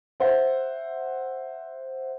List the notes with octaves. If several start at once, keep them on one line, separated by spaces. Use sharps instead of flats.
C5 E5 F#5